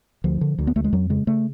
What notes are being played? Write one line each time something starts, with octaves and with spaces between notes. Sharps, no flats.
D2 F3
D3
D2
B3
D2 A3
G#3
F2 F#3
C#3 G#3
C#3 A3